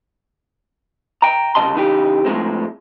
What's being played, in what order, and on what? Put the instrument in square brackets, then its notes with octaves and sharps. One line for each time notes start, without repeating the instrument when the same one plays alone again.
[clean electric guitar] G5 A#5
C2 G2 C#3 D#5 A5 C6
C#3 E3 D#4 E4 G4
A2 F3 G#3 C4